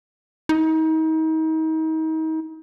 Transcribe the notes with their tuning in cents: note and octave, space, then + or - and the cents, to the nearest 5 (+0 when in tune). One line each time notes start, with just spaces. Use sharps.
D#4 +35